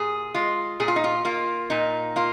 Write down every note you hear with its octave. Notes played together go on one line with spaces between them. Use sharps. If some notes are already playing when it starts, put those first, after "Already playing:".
Already playing: A#2 G#4
G#3 F4
A#2 G#4
F4
D#4
F4
A#3 F4
A#2 D#4
A#3 F4